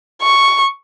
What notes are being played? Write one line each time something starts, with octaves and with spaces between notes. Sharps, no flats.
C#6